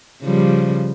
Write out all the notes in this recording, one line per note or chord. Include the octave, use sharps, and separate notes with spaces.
C#3 F3 G3